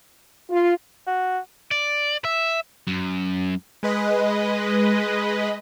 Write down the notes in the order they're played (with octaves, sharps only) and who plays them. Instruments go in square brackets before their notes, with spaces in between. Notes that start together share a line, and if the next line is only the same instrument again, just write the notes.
[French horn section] F4
[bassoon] F#4
[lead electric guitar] D5
E5
[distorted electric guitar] F#2
[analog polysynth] G#3 B4 D#5